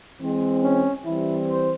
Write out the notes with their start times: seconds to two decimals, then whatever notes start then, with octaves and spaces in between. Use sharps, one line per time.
0.20 E3 G#3 C4
0.62 C#4
1.04 E3 G3 C4 E4
1.47 C5